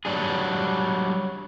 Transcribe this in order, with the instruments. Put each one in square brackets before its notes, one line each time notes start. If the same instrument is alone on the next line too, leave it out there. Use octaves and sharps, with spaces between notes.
[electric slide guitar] F#3 G3 D4 G#4